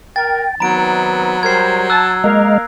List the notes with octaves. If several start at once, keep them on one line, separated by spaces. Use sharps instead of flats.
A#4 G5 A6
D#3 F#3 B3 C4 A#5 B5 D7
G3 A#4 C5 G#6 C7
A5 E6 F#6
G#3 A#3 A#4 D#5 F5 A#5